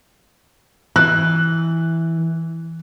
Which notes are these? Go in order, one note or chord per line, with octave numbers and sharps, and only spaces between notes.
E3 F#6